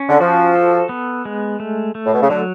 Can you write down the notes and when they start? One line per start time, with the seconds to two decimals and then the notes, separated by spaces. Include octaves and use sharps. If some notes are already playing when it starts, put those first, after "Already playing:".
Already playing: C#4
0.09 D3
0.20 F3 F#4
0.55 A4
0.89 B3
1.25 G#3
1.60 A3
1.95 A3
2.06 A2
2.14 B2
2.22 C#3
2.29 D3 F#3